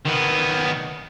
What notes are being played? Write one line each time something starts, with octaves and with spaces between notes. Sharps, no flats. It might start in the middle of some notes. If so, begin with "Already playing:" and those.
D#3 B3